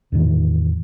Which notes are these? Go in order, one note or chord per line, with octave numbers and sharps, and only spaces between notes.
E2 A2 D#3 E3